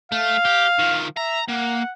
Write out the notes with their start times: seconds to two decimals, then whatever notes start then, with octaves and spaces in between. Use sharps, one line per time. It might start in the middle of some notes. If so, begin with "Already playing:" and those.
0.12 A3 F5
0.45 G4
0.79 D#3 F3
1.17 E5 A#5
1.49 A#3 F#5